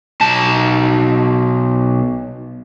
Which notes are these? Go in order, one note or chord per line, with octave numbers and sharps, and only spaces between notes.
B1 A5